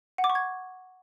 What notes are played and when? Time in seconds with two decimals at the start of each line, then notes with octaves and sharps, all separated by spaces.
0.18 F#5
0.24 D6
0.30 C#6
0.35 G#6